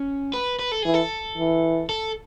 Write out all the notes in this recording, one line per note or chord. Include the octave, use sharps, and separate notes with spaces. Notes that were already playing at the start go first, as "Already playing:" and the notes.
Already playing: C#4
B4
B4
A4
E3 G#4
A4
E3
A4